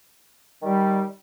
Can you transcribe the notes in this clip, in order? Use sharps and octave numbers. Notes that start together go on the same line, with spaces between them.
D#3 G3